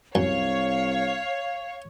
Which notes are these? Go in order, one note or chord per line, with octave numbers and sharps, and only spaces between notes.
C2 F#2 C#5 F5